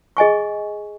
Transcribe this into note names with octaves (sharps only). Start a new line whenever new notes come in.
G#4 D#5 G#5 C#6